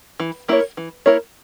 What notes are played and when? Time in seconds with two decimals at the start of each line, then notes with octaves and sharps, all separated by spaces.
0.20 E3
0.48 A#3 E4 A#4 C#5
0.77 E3
1.06 A#3 E4 A#4 C#5